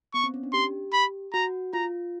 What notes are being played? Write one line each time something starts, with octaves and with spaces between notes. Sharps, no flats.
B3 C#6
C4
C#4
D4
G4 C6
B5
F#4 A#5
F4 A#5